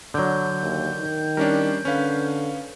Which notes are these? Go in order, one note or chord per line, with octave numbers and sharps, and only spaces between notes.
D3 F#3 G6
D#2
D#3
G3 C#4 D4 A#4
D3 C#4 B4 F5